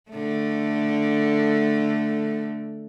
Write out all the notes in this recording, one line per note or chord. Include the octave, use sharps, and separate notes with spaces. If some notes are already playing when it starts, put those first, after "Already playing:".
D3 A3